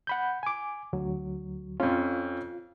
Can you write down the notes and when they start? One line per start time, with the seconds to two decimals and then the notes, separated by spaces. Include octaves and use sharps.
0.07 F#5 B5 G6
0.43 G#5 D6
0.93 D2 F#3
1.80 F2 C#4 F4